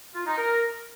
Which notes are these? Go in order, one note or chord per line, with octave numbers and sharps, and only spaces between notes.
F4
D#4
A#4